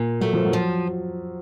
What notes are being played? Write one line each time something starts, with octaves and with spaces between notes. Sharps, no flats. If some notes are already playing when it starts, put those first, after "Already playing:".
Already playing: A#2
F#3 A3
F3
F#3
F3